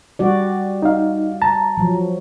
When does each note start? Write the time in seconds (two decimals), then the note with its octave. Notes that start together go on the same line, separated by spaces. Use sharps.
0.19 G3 F#4 D5
0.82 D#4 F5
1.42 A5 A#5
1.77 F3 F#3